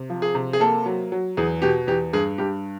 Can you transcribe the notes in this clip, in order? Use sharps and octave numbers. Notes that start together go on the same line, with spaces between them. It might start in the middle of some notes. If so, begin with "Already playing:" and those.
Already playing: C3
F3
G#4
C3
G#4
A#3 A4
F#3
F#3
E2 G#4
B2 G4
E2 G4
G2 G#4
G2 G4